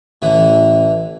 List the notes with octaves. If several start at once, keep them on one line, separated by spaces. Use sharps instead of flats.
A1 D3 E3